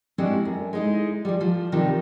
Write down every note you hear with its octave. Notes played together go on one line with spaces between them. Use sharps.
G3 G#3 C4 D4 E4 F#4
F#2
G#3 D#4 E4
F3 G3
F3
C3 D#3 F3 G3